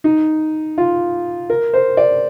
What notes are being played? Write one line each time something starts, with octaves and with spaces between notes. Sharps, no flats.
D#4
F4
A#4
C5
D5